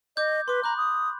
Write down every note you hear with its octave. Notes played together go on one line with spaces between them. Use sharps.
D#5 D6 G6
B4 C6 D6
A#5 B5 D6 F#6
D#6